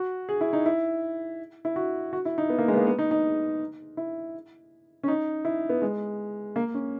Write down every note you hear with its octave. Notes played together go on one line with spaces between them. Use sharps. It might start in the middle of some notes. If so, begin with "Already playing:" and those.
Already playing: F#4
G#4
E4
D#4
E4
E4
F#4
F#4
E4
D#4
B3
A#3
G#3
B3
A#3
B3
D#4
D#4
E4
C#4
D#4
E4
B3
G#3
A#3
C#4